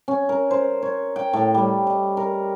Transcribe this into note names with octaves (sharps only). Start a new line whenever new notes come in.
C#4
A#4
C5
C#5
G5
A2
G3
D#5
A#4